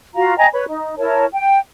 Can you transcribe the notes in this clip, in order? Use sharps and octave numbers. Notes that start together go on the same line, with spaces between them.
F4 F#4 F5 A#5
D#5 G5 G#5 A#5
B4 C#5 B5
D#4
E4 A#4 C#5 A5
G5